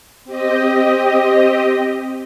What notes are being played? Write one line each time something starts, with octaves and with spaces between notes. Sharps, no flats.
C4 G4 D#5